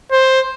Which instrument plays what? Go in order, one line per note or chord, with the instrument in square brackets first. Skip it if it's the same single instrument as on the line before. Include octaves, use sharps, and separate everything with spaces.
[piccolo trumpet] C5